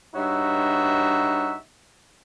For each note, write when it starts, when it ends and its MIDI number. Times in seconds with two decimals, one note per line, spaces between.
0.15 1.54 43
0.15 1.54 63
0.15 1.54 66
0.15 1.54 73
0.15 1.54 76